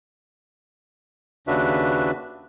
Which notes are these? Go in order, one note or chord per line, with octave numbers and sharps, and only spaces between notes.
D#2 C#3 D4 F#4 B4 E5